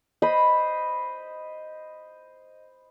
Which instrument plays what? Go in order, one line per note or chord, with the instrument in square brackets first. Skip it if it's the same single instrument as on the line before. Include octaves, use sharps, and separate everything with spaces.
[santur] C5 D#5 B5